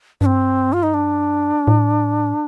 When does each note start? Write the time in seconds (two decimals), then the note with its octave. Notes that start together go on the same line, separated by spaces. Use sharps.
0.21 G2 D4
0.26 C4
0.73 F4
0.83 D#4
0.94 D4
1.68 A2